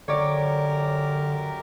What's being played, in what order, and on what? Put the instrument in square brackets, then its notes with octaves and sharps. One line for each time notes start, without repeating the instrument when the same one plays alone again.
[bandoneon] F#2 G4 A#4 [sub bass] D3 [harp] C#5 D5